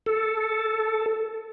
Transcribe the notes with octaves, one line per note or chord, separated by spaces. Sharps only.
A4